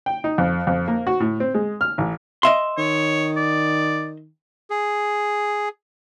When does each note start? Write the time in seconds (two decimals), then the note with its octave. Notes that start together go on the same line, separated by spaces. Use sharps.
0.06 G5
0.24 D#4
0.38 F2
0.67 F2
0.88 A#3
1.07 F#4
1.20 A2
1.40 C4
1.54 G#3
1.81 F6
1.98 A1
2.43 D#5 E5 C6
2.78 D#3 C#5
3.37 D5
4.70 G#4